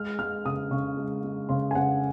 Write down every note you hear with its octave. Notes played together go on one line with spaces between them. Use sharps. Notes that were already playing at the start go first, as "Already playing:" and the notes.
Already playing: G#3 F6
G#3 F6
C#3 D#6
C#3 C#6
G#3
G#3
C#3 C6
G#5
C#3 F#5